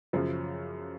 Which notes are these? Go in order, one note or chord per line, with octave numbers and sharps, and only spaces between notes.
F#2 C#3 F3